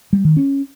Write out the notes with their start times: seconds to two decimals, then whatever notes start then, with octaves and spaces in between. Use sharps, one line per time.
0.13 G3
0.25 D#3
0.37 C#4